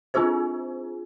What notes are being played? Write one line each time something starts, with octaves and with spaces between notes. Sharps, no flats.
C4 D4 F4 G#4 C5